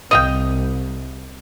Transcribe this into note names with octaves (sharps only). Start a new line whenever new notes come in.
C2 D#5 F5 G5